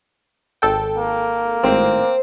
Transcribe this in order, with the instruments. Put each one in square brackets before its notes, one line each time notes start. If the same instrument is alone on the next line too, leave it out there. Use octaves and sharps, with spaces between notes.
[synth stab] G#1 A4 G5
[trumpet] A#3
[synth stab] G#1 A2 [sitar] C4